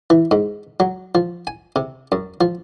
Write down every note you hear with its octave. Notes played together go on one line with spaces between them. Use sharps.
E3
G#2
F#3
F3
G#5
C3
F#2
F3